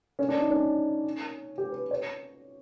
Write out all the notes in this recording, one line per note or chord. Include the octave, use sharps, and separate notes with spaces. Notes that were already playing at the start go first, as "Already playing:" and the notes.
C#4
D4
D#4
C#4
G4
B4
C#5